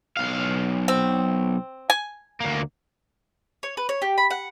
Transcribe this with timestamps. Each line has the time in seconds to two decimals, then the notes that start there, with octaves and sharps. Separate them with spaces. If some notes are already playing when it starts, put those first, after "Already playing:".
0.17 B1 F5
0.88 C4
1.90 G#5
2.41 D2 A#3
3.63 C#5
3.77 B4
3.89 C#5
4.02 G4
4.18 B5
4.30 F#5